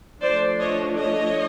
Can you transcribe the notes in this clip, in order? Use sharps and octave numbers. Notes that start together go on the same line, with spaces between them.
F3 A3 D4 C5 D5
C#5 D#5
C#5 D#5